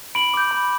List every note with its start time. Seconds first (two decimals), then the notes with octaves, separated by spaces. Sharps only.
0.15 B5 D7 F#7
0.34 D6 G6
0.51 B5